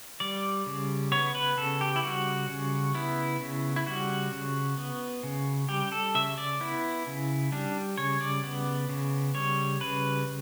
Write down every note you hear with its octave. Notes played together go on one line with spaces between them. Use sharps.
G3 D5
C#3
B3 C#5
B4
C#3 A4
G4
E4
G3 F#4
C#3
B3 E4
C#3
E4
G3 F#4
C#3
B3
C#3
G3 G4
A4
C#3 E5
D5
B3 E4
C#3
G3 D4
C#3 C#5
D5
B3
C#3
G3 C#5
C#3 B4